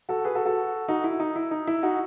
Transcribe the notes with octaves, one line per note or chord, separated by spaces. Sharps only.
F#4 A4
G#4 B4
F#4 A4
F#4 A4
D#4 F#4
E4
D#4
E4
D#4
E4
D#4 F#4